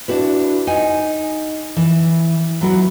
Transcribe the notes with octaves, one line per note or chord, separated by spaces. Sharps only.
D4 E4 F#4 B4
D#4 F#5 G#5
E3
F#3 B3 E4 F#4